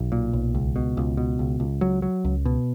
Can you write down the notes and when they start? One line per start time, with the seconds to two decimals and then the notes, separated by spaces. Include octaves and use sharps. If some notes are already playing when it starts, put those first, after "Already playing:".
Already playing: B1
0.12 A#2
0.33 B1
0.55 C#2
0.76 B2
0.97 C#2
1.17 B2
1.39 C#2
1.60 C#2
1.81 F#3
2.02 F#3
2.25 C#2
2.45 B2